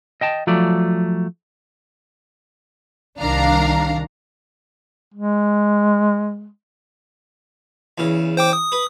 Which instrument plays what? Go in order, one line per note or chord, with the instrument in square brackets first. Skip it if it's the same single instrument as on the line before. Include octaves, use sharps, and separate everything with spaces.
[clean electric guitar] D#5 G5 A5
F3 F#3 A3 D5
[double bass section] C2 D#3 [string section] D4 F5 A#5
[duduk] G#3
[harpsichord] E2 C#3
[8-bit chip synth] C5 G5 D6
D#6
[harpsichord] B4